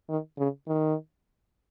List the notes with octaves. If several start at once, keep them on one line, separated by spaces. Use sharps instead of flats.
D#3
C#3
D#3